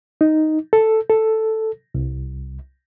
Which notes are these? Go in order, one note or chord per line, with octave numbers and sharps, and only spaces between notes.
D#4
A4
A4
C2